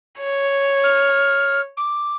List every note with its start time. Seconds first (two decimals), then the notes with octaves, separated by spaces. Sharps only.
0.20 C#5
0.83 F6
1.77 D6